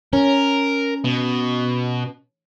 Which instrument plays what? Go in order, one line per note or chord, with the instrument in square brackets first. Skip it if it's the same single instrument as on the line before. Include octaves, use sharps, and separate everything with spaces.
[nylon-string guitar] C#4 [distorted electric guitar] A#4
[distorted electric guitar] B2